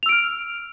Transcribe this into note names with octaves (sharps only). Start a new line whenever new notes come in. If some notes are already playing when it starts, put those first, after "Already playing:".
E6 F6 D7 F7